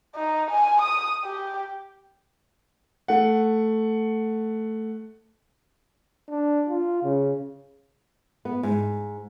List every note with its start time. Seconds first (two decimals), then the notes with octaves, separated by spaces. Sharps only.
0.16 D#4
0.51 G#5
0.82 D#6
1.24 G4
3.08 A3 F#5
6.29 D4
6.69 F4
7.03 C#3
8.45 B3
8.63 G#2